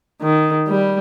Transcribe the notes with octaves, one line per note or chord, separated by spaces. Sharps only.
D#3
G3